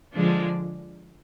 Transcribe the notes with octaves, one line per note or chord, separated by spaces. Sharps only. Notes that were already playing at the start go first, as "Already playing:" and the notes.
D3 F3 G#3 D4